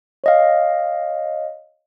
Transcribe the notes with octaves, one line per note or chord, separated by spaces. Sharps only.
C#5 D#5 F5